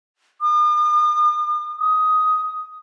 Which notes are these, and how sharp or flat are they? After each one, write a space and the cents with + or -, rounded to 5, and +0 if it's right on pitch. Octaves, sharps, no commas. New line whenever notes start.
D#6 -45
D#6 +10